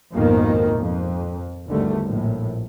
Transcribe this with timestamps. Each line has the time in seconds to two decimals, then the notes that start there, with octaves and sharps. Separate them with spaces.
0.12 A#1 F2 G#2 B2 D#3 A#3
0.78 F2
1.67 G#1 E2 D3 G3 A3
2.08 A#1 A2